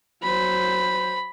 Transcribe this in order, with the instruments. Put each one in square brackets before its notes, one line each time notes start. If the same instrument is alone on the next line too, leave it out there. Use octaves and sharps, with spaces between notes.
[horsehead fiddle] F#3 C5 [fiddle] B5